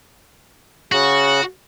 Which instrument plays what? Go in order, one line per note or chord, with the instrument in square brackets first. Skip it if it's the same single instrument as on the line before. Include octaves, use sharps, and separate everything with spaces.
[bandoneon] C#3 [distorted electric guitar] F#4